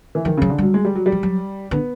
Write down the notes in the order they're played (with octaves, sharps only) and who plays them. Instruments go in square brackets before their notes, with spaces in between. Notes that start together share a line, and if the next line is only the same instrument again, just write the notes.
[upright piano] E3
[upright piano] D#3 [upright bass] F3
[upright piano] C#3 [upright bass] F#3
[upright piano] D3
[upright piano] F#3 [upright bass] G3
[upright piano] G#3
G3
F#3
G3
[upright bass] F3
F#3
[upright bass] D3 [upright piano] B3